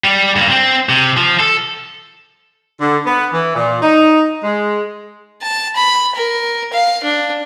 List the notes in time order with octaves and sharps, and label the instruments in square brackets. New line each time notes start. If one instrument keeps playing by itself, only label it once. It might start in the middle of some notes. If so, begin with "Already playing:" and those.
[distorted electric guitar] G3
G2 A#3
C4
C3
F3
A4
[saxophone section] D3
B3
E3
A#2
D#4
G#3
[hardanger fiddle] A5
B5
A#4
F5
D4